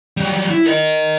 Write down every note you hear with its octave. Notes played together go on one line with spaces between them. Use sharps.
F#3 G3
E4
A#4 D#5